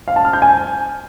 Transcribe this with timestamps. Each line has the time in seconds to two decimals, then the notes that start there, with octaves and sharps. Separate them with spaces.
0.08 F5
0.16 A5
0.25 F6
0.33 G6
0.42 G#5